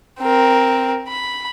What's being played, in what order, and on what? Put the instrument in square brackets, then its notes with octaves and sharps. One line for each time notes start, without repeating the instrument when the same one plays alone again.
[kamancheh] C4 A#4
B5